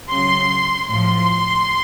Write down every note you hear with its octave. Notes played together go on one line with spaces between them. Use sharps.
C#3 F#3 C6
A2 F3 C6